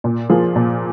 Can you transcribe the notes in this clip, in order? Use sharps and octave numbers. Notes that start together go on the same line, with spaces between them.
A#2
F3 A#3 F4 G#4
A#2